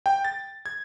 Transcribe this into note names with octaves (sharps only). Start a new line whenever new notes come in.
G5
A6
G#6